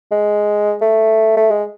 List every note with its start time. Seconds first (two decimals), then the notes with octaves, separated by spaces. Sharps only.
0.11 G#3
0.81 A3
1.37 A3
1.51 G#3